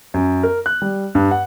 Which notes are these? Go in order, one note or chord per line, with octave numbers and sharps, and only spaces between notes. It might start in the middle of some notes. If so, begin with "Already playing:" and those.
F#2
A#4
F#6
G3
G2
F#5